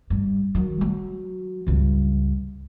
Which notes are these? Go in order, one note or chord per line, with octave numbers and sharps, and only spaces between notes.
G2
D#3 F#3
F#3
C#2 G2